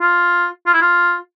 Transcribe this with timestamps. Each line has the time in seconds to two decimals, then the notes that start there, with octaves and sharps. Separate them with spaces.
0.01 F4
0.66 F4
0.73 E4
0.81 F4